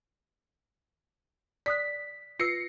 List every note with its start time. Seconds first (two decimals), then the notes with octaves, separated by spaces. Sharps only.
1.66 D5 D#6 F#6 B6
2.39 F4 B4 E6 A#6 C7 C#7